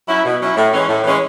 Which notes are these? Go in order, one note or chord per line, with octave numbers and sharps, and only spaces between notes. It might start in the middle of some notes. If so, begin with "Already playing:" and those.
F#3 C#4 E4
B2
F#3 C#4 E4
A2
E3 G#3 C#4
A2
E3 G#3 C#4